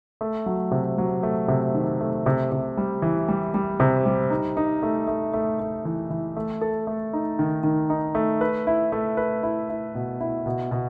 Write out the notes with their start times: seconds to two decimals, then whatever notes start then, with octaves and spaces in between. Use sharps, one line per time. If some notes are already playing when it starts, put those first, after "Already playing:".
0.21 A3
0.46 F#3
0.71 C3
0.98 F#3
1.23 A3
1.48 C3
1.74 D#3
2.01 A3
2.26 C3
2.52 C3
2.77 G3
3.02 E3
3.29 G3
3.54 G3
3.80 C3
4.06 G3
4.30 D#4
4.57 D#4
4.83 A3
5.08 A3
5.33 A3
5.60 A3
5.85 E3
6.10 E3
6.36 A3
6.61 A4
6.87 A3
7.13 D#4
7.39 D#3
7.63 D#3
7.90 D#4
8.15 A3
8.41 B4
8.67 E4
8.92 A3
9.17 B4
9.43 E4
9.70 E4
9.95 B2
10.21 E4
10.46 B2
10.71 B2